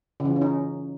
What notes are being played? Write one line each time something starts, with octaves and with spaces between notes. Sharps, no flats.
C#3
E3
F4
C#4
D#4